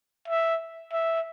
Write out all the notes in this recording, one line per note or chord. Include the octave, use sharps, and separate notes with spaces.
E5
E5